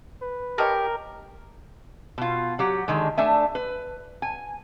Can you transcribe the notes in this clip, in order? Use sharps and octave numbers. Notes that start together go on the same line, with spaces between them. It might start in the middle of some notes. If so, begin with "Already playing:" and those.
B4
G4 A#4 C#5 D#5 A5
B2 F4
F#3 G4 F#5
D3 D#3 G#3
A3 D4 E5 G#5
B4
G#5